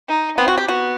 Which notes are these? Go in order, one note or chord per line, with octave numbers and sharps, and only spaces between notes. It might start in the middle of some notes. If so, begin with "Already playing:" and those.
D#4
B3 C4
F#4
G4
B3 F#4